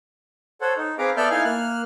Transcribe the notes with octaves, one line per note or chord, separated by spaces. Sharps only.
A4 C5 C#5 F#5
D#4
C4 G#4 B4 F5 A#5 D6
B3 A4 D5 E5 F6 G6
D#4 E4 F5 G#5 F6
A#3 F6 F#6